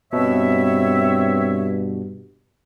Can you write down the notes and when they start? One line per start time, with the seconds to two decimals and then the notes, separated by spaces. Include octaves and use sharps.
0.13 G2 B2 C4 C#5 E5